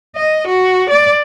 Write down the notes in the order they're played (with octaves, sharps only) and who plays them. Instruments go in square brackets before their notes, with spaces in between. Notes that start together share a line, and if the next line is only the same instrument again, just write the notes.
[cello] D#5
F#4
D5